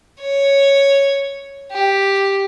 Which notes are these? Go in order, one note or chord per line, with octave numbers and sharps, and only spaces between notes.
C#5
G4